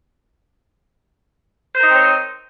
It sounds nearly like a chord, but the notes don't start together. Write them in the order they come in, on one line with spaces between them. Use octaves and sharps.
C5 A#4 D#4 C4 C#5